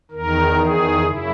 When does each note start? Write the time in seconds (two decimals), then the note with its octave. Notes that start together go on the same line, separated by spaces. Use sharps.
0.11 E2 D#3 A#4
0.57 G#4
1.02 F#2 C#3 E4